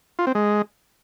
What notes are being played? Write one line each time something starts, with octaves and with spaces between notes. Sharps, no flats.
F4
C4
G#3